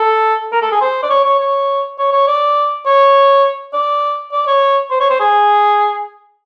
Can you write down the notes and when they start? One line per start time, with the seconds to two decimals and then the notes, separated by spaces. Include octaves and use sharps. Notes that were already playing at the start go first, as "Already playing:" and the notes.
Already playing: A4
0.52 A#4
0.62 A4
0.72 G#4
0.81 C5
1.03 D5
1.10 C#5
1.25 C#5
1.39 C#5
1.98 C#5
2.12 C#5
2.27 D5
2.86 C#5
3.73 D5
4.32 D5
4.47 C#5
4.91 C5
5.00 C#5
5.10 C5
5.20 G#4